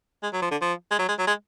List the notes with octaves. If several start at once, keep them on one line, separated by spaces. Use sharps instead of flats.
G#3
F#3
F3
D3
F3
G#3
F#3
G#3
F#3
G#3